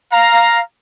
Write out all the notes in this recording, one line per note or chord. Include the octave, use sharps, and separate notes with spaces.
F5 A#5